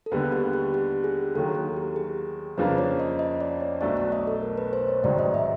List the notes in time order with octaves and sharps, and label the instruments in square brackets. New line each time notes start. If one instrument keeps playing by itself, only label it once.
[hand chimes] A4
[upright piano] D#2 D3 G3 B3 [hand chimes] G#4
[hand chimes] G4
G4
G4
G#4
[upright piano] D#2 D#3 F#3 [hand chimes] A4
[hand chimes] A4
G4
G#4
[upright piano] F2 C#3 F3 A#3 D4 [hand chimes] B4
[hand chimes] C#5
D#5
D#5
D5
C#5
[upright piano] B1 B2 F#3 A3 D4 [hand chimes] D5
[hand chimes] D5
D#5
A4
A#4
B4
C5
C#5
[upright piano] A1 G#2 D#3 F#3 [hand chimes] D5
[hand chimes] D#5
E5